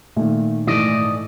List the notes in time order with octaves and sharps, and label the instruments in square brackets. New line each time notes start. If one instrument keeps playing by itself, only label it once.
[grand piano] A#2 D#3 [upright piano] A3
[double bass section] G#2 A3 [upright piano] E3 [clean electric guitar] D5 D#5